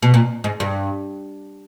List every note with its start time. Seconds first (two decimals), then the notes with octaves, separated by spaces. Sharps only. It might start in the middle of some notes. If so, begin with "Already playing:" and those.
0.02 B2
0.14 A#2
0.44 G#2
0.60 G2